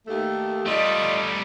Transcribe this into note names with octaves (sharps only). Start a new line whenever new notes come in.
D#2 A3
G3 A3 F4 D5 D#5